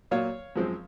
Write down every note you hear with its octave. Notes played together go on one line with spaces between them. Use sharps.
A#2 F#3 A#3 C#5 F5
F#2 F3 G#3 C4